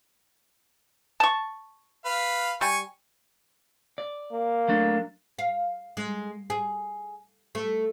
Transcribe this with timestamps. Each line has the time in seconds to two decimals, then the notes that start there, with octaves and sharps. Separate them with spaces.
1.20 A5 C#6
2.05 B4 F5
2.61 G3 G#5 C#6
3.98 D5
4.32 A#3
4.68 F#3 A3 D4
5.39 F5
5.97 G#3
6.50 G#4
7.55 A3